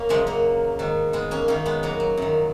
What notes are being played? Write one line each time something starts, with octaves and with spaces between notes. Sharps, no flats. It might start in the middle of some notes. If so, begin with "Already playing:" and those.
Already playing: A#3 C#4
F#2 C#3 F3 G#3
F#3 A#3
G#2 D#3
G#3 B3
A#3 C#4
F#2 D#3 A#3 C#4
G#3 B3
F#3 A#3
F#3
F#2 D#3